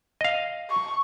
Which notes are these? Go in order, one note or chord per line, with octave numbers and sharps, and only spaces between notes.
D#5 F5
C#6